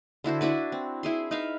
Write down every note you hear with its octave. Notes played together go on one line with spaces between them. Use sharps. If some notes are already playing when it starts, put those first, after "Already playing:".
D3 E4 F#4 C5
D4 E4 F#4 B4
C4
E4 G#4 C6
D#4 B4 E5 F5